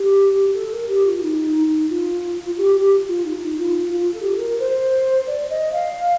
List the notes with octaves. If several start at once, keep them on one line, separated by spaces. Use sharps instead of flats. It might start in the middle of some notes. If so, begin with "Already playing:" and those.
Already playing: G4
A4
A#4
G4
F4
F4
D#4
D#4
F4
G4
G4
F4
D#4
D#4
F4
F4
A4
G4
A4
A#4
C5
D5
D#5
F5